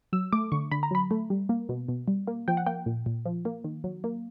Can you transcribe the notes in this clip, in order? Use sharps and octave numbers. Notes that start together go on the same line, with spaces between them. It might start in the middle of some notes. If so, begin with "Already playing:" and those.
F#3 E6
A3 D6
D3 C#6
D3 B5
A#5
F#3 B5
A3
G3
A#3
B2
B2
G3
A#3
F3 G5
F#5
A#3 G5
A#2
A#2
F3
A#3
D#3
F#3
A#3